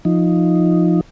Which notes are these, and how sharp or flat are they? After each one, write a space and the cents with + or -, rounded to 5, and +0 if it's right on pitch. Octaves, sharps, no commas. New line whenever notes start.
F3 +0 D#4 +0